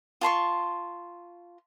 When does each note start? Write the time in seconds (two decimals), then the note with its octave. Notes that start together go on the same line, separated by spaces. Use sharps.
0.21 F4 A5 C6 C#6